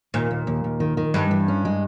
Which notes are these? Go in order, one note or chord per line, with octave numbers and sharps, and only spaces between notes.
D#2 A#2
D#2
D#2
D#2
D#3
D#3
G2 G#3
E3
C#4
G#3